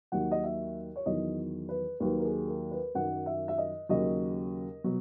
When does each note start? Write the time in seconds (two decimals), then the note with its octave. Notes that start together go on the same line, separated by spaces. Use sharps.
0.12 D#2 D#3 F#3 F#5
0.31 D#5
0.44 E5
0.96 C#5
1.06 E2 D#3 F#3 D#5
1.69 B4
2.00 D#2 D#3 F#3 B4
2.20 A#4
2.24 G#4
2.48 A#4
2.71 B4
2.95 F#2 D#3 F#3 F#5
3.26 E5
3.48 E5
3.58 D#5
3.89 D#2 C#3 F#3 D#5
4.84 B2 F#3